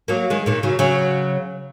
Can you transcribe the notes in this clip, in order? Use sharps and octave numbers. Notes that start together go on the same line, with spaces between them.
F#3 A#3
D#3 G#3
A#2 D#3
C#3 F#3
C#3 F#3